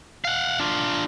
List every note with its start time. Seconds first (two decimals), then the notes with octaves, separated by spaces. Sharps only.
0.25 F5 F#5
0.60 D4 F4